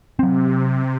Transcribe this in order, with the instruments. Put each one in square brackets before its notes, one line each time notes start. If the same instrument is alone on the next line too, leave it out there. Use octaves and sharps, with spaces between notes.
[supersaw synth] C3 [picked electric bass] F#3 C4